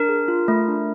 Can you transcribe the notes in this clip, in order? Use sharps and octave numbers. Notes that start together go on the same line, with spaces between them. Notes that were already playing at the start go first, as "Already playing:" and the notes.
Already playing: D4 A#4
G#4
F4
A3
D4